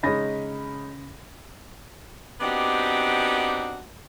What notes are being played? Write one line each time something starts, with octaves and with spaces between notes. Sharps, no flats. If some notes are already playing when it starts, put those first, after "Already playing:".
C#3 G#3 C#4 D#4 B5 A#6
B3 C4 D4 D#4 F#4 G4